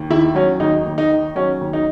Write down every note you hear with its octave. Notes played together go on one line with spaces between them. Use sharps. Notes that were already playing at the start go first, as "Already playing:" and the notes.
Already playing: D#2
D#3 E4
F#3 C#4
D#2 D#4
D#2
D#4
D#3
F#3 C#4
D#2
D#4